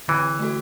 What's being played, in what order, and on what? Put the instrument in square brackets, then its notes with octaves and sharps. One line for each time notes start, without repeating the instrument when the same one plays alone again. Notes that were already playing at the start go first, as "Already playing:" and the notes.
[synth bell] D3 [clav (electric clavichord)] E3
[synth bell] A3 F#4 A4